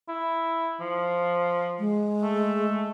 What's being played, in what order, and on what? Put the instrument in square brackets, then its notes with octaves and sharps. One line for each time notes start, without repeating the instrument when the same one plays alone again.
[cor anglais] E4
F3
[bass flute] G#3
[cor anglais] A3